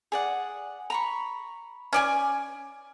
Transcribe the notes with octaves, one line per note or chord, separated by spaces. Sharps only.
G#4 D5 F#5
A#5 B5 C#6
C#4 D5 G#5